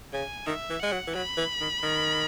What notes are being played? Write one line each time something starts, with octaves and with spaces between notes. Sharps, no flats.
C#3 G#5
D#3 E5
E3
G#3 F#5
F#3
E3
F#3 B5
E3
D#3
D#3